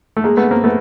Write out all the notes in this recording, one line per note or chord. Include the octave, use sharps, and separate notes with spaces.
A3
G#3 A#3
A3 B3
A#3 C4
A3 B3